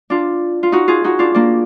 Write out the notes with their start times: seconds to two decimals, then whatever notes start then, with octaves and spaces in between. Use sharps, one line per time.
0.10 D4 F4
0.63 F4
0.72 D#4 F#4
0.88 F4 G#4
1.04 D#4 F#4
1.19 D4 F4
1.34 A#3 D4